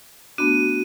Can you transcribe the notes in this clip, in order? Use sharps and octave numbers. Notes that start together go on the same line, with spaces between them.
A3 B3 D4 F#4 D#7